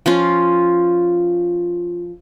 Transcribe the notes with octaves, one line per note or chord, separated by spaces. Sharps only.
F3 C#4 F4